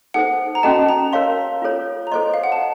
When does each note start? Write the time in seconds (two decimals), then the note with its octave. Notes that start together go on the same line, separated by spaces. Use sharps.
0.14 D#4 A4 C5 F#5
0.55 A#5
0.63 C#4 F#4 A4 D#5 A5
0.89 A#5
1.13 A#4 C#5 F5 C6
1.62 F4 A4 C#5
2.07 A#5
2.11 A4 C5 D#5 C6
2.34 F5
2.44 F#5
2.52 A5